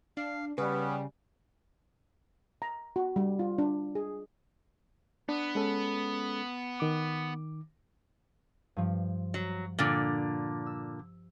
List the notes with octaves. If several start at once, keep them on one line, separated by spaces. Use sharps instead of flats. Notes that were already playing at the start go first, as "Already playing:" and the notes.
D4 F5
C#3 G3 B3 C#4 B4
A#5
F#4
G3
F4
D4
G#4
B3 D4
G#3 C#4 A4
D#3 D6
G2 F3
F#3
A#2 D3
E6